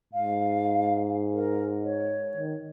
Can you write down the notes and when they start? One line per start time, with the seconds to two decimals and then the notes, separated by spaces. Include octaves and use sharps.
0.13 G#2 F5
1.33 A#4
1.84 C#5
2.37 D#3